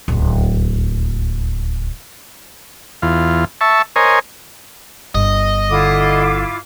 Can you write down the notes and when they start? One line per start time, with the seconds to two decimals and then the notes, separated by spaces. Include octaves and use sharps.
0.08 D1 C#2
3.02 E2 F4
3.61 E5 A5 C#6
3.96 A#4 C5 C#5 D#5 G#5
5.15 G1 D#5
5.69 D3 E4 F4 D6